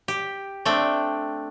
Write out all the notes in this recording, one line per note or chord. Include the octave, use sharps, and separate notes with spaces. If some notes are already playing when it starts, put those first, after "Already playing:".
G4
A3 C4 D4 G5